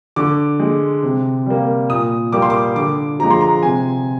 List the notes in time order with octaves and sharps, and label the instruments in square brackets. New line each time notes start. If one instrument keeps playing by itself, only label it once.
[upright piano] D3 D6
G#3
C3
G3 A#3
A#2 D#6
G3 A#3 D6
C6
D6
D3 D6
F3 G#3 A#5
C6
A#5
C3 G#5